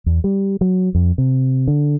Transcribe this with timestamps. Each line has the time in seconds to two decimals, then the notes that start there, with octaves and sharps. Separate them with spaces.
0.06 E2
0.24 G3
0.61 F#3
0.95 F2
1.18 C3
1.68 D3